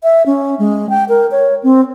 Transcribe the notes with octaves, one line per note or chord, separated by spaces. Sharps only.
E5
C#4
G#3
G5
A#4
C#5
C4